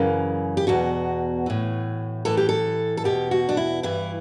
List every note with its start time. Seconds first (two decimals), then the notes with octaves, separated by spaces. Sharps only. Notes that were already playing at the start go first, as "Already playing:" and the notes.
Already playing: F#2 C#3 E3
0.57 G4
0.67 E2 B2 F#4
1.46 A2 E3
2.25 A2 E3 A4
2.37 G4
2.49 A4
2.97 A4
3.04 E2 B2 G4
3.31 F#4
3.49 D4
3.57 E4
3.83 G2 E3 E4